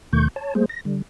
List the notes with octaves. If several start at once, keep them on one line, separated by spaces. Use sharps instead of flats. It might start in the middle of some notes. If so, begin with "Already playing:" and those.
D#2 B2 D#3 A3 C#6 G6
C#5 A5
G3 A3 A#3 G#4 C5
A#6
D3 G3